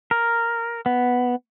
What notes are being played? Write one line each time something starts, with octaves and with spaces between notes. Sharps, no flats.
A#4
B3